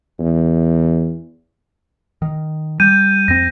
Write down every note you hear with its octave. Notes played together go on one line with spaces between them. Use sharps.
E2
D#3
G3 G6 D#7
F2 C4 A#6